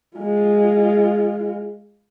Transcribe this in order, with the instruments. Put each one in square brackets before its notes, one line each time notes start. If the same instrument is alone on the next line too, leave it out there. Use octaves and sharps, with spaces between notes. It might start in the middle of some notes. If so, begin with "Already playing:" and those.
[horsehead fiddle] G#3 F4